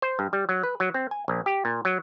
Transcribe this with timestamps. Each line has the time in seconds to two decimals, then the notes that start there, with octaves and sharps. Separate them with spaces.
0.02 C5
0.19 G2
0.33 G3
0.49 F#3
0.63 B4
0.80 F#3
0.94 C4
1.11 G#5
1.28 A#1
1.46 G4
1.65 A#2
1.85 F#3